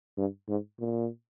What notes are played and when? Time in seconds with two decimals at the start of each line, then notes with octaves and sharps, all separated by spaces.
0.17 G2
0.48 G#2
0.80 A#2